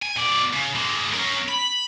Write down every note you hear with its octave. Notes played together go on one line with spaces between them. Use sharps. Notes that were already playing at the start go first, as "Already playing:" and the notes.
G#5
B2 D5
C#3
G#3 A#3
C#4 A#4
B5